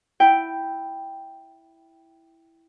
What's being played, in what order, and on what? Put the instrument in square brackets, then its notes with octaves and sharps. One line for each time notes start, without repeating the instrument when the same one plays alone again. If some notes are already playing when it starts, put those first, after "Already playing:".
[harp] E4 G5